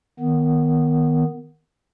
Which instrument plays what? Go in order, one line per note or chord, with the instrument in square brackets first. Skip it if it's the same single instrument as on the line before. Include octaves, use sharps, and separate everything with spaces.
[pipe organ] D#3 B3